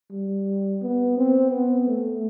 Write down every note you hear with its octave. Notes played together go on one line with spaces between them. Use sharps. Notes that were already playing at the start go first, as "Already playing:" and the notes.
G3
B3
C4
B3
A3